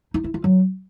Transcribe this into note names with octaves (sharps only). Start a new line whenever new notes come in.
D#4
E4
F4
F#3